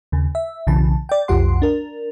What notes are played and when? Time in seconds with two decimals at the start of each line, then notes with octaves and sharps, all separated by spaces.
0.12 D#2 C#3
0.35 E5
0.67 B1 C#3 E3 A5
1.09 D5 G5
1.28 B1 F2 F4 G4 F#5 C6
1.62 D4 A#4